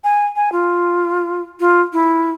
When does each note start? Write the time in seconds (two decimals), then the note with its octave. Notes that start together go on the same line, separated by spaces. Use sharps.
0.04 G#5
0.36 G#5
0.52 F4
1.60 F4
1.93 E4